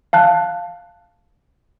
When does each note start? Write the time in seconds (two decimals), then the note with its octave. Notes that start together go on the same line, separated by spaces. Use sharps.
0.13 F5 A5 F#6